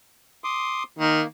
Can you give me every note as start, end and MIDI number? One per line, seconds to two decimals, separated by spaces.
0.44 0.83 84
0.44 0.83 86
0.44 0.83 87
0.99 1.21 51
0.99 1.27 58